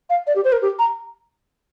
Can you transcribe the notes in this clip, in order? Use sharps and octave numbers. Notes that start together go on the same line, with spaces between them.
F5
D5
G4
C5
A#4
G4
A#5